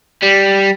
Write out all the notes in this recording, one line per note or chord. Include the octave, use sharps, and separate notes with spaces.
G3